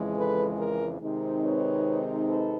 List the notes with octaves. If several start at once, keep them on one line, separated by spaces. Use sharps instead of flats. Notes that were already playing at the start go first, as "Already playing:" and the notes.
Already playing: F2 C#3 E3 G#3
A4 B4
G#4 A#4
C3 D#3 G#3 C4 D#4
B4 C#5
A4 B4